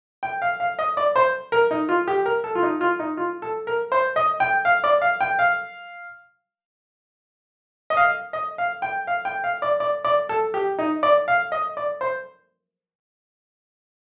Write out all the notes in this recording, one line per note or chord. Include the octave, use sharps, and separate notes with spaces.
G5
F5
F5
D#5
D5
C5
A#4
D#4
F4
G4
A#4
A4
F4
D#4
F4
D#4
F4
A4
A#4
C5
D#5
G5
F5
D5
F5
G5
F5
D#5
F5
D#5
F5
G5
F5
G5
F5
D5
D5
D5
A4
G4
D#4
D5
F5
D#5
D5
C5